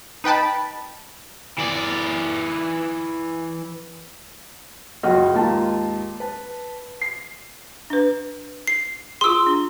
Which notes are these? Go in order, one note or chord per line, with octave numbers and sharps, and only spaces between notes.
D#4 B4 G5 A5 B5
E3 D5
F#1 C#2 C#3 F#4 D#5 F6
D#2 G#2 A#3 F4 A5
B4 A5
C7
D4 B4
C7
F4 G#4 C6 E6
D4